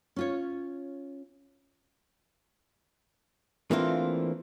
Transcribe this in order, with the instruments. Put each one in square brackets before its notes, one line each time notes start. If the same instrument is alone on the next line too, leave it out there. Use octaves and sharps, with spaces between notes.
[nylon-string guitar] C#4 F4 C#5
[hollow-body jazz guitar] E3 A3 A#3 C4 D4 F4